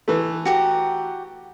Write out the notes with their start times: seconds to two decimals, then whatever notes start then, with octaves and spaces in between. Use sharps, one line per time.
0.08 E3 A3
0.45 F#4 G4 A#5